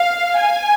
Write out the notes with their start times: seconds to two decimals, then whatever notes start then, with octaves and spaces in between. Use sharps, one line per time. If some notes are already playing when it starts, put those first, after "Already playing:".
Already playing: F5
0.37 G#5